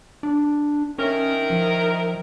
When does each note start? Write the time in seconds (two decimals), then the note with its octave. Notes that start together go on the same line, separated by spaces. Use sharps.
0.23 D4
0.98 D#3 C#4 E4 A#4
1.50 F3